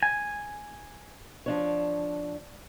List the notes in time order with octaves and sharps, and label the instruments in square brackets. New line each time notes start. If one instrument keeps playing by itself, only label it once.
[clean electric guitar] G#5
[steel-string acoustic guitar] F3 D4 C#5